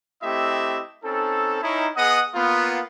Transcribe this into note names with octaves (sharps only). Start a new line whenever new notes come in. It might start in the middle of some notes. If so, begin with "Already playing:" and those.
A3 C4 E4 G4 D#5 E5
C4 C#4 D#4 A4
C#4 D#4 E4
B3 G#4 D#5 F#5 D#6
A#3 B3 F4